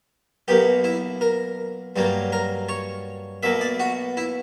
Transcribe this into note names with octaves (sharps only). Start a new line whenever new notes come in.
B1 B2 A#3 G4
E4
A#4
G2 F#3 A#3
A#4
C#5
B1 B2 A#3 E5
D5
F#4
E4